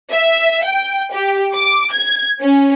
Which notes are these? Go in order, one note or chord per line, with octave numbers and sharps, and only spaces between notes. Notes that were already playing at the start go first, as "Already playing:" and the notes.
E5
G5
G4
D6
G#6
C#4